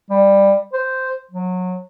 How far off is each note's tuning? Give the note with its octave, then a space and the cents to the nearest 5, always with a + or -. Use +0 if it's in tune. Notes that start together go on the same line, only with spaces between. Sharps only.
G3 +15
C5 -5
F#3 -20